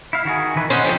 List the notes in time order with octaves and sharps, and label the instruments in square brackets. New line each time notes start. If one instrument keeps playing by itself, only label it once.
[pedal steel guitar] E4 F5
D#3 F#4 G#4
D#3 E3 B4
[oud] C#4 [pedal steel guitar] C5 D#5 F#5
[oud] F3 D4 D#4 [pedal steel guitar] G4